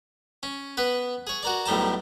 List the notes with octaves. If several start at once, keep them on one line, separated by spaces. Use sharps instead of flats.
C#4
B3 B4
G#4 C#5
F#4 A#4 D5
B1 A2 G3 A#4 A5